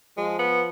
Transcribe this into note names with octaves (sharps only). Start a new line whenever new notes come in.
F3 G#3
B3